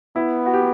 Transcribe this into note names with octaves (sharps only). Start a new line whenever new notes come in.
B3 E4
F#4
G4